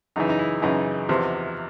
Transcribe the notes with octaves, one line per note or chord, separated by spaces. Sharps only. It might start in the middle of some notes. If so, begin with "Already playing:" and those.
F#2 C#3 E3 D#4
D#4
E4
F#2 C#3 E3 D#4
E2 C3 F3